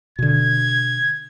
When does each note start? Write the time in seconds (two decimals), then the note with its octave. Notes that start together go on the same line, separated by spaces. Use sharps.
0.19 B2 D3 G#6